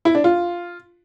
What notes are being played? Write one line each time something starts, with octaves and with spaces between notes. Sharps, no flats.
E4
D4
F4